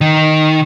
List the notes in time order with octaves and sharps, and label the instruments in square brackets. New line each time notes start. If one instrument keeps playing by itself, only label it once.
[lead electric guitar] D#3